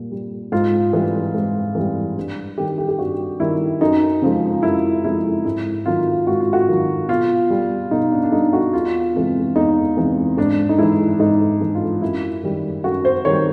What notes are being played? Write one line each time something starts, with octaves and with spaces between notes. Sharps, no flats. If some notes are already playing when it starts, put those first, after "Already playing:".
Already playing: A#2 G3
G3
G#2 F4
E3 G3
G#2
E3 G3
G2
D#3 G3 G4
G4
G4
G2 F#4
D#3 G3 E4
F#2 D#4
C#3 F3 G#3
F#2 E4
C#3 F3 G#3 E4
G#2 E4
D#3 F#3 F4
G#2 F#4
F4
F#4
D#3 F#3
B2 F4
G3
B2 D#4
D4
D4
G3 D#4
F#4
E2 F4
C3 E3 G#3
E2 D#4
C3 E3 G#3
G#2 D4
D#4
E3 G#3 E4
G#2 D#4
E3 G#3
F4
F#2 E4
D#3 G3
F#2 F#4
C5
D#3 G3 C#5